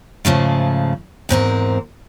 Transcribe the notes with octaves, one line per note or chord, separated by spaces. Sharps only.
G#2 C#3 F3 A3
E2 G#2 C4 A#4